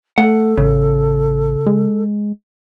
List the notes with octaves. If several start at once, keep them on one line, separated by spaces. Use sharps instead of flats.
A3 A4 F#5
A1 C#3
G#3